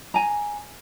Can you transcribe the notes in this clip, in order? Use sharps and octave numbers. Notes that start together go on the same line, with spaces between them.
G#5 A#5